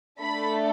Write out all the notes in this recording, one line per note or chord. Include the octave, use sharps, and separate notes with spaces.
A3 D4 A4 B5